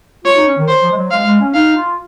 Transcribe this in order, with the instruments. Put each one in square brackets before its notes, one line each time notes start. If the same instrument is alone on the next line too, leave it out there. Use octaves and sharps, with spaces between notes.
[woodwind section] F4 [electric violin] C#5
[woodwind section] D#4
C#4
D#3
[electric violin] C5
[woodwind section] F3
G#3
F#3
[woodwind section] G#3 [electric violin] F5
[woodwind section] G#3
C#4
[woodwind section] D#4 [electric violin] F5
[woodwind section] F4